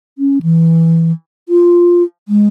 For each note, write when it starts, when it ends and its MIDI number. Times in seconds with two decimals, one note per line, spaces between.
0.18 0.38 61
0.42 1.12 52
1.49 2.03 65
2.28 2.48 56